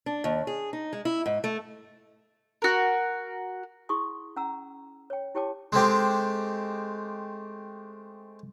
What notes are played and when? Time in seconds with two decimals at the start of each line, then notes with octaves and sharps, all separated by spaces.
0.06 D4
0.24 D#2
0.47 G#4
0.73 D#4
0.93 G#3
1.05 E4
1.26 G#2
1.44 A3
2.62 F#4 A#4
3.89 E4 G#4 C6 C#6 D#6
4.36 C#4 F#5 A#5 E6
5.10 C#5 G5
5.35 E4 G4 C#5 G5 A5 D6
5.72 G#3 A3 C4 G4